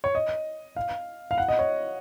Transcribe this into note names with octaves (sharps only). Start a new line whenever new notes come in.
C#5
D#5
F5
F5
F#5
D#5
C#5